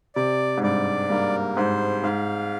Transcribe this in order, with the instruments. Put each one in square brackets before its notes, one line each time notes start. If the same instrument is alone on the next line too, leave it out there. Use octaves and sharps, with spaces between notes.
[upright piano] C3 [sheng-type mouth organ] D5
[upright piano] G#2
[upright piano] G2 [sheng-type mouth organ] D5
[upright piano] G2 [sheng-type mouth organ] A#3
[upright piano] G#2 [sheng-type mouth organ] C5
[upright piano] G#2 [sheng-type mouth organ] F5